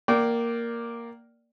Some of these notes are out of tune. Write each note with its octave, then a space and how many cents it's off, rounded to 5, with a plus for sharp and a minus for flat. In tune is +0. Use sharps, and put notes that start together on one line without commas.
A#3 +0 D5 +0 G5 -30